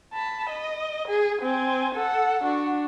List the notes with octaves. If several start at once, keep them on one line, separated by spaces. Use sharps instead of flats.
A5 B5
D#5
G#4
C4 G#5
A4 F#5
D4 F#4